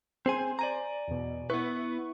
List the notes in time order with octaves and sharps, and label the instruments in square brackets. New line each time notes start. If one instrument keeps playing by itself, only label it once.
[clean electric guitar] C4 G#4 G#5 [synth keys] C5
[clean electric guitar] D5 G#5 A#5
[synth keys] E2 B2
[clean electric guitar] B3 B4 [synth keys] E4 C#6